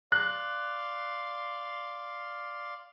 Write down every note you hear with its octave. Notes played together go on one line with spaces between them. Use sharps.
D5 F5 C6 F#6